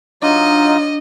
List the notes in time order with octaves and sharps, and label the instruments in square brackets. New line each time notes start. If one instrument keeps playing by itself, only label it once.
[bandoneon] F#3 D#4 F4 [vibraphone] D4 [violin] D#5